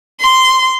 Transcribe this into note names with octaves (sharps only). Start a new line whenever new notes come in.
C6